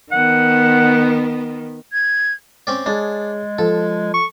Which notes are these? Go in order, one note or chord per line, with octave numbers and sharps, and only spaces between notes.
D#3 B3 F#5
G#6
C4 C#4 D5
G#3 D4 G#4 C#5 A6
F3 A4
C#6